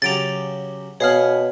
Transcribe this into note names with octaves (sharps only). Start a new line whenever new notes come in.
C#3 F#3 G4 A6 D7 F7
B2 B3 G#4 C#5 F5 F6